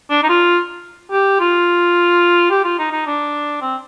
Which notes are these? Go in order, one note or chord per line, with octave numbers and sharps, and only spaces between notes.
D4
D#4
F4
G4
F4
G4
F4
D#4
D#4
D4
C4